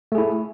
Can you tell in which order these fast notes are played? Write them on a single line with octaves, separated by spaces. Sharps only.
A3 G#4 E4